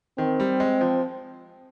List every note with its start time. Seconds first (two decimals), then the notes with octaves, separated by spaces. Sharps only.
0.18 D#3 C4
0.40 G3
0.60 G#3
0.81 F3